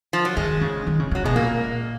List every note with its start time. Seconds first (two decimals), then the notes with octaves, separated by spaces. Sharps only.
0.13 F3
0.25 F#3
0.36 D#3 G#3
0.61 C#3
0.87 D#3
0.99 C#3
1.11 C#3 F#3
1.24 B2 G#3
1.36 A#2 A#3